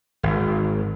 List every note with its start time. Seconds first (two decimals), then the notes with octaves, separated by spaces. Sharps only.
0.23 G#1